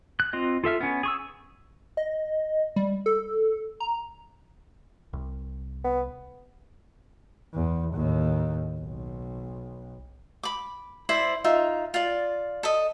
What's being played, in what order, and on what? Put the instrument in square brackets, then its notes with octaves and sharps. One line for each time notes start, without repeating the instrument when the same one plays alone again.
[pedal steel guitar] F#6
C4 F4 D#5
F4 A4 E5 F6
B3 C#4
G#4 C#6 E6
[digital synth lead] D#5
G3
A4
A#5
[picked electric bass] C2
[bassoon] B3
[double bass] E2
D#2 A2
B1
[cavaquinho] B5 D6
E4 C5 D5 E5
D#4 F4 E5
F4 D5
A4 D#5